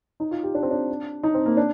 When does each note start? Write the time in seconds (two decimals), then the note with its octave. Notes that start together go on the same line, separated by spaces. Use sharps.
0.20 D#4
0.31 F4
0.43 G4
0.55 D4
0.62 C4
0.71 D4
1.23 D#4
1.34 C4
1.46 A#3
1.57 D4